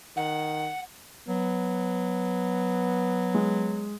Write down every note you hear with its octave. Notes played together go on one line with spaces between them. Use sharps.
D#3 F#5
F#3 B3
G#3